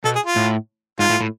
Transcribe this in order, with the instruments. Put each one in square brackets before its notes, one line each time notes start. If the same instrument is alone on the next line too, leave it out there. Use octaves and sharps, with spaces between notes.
[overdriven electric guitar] B2 [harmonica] A4
[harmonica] G#4
F4
[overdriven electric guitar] A2
[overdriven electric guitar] G#2 [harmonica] F4
[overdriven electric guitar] A2
A2